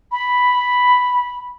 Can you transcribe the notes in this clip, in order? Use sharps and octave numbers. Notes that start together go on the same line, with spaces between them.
B5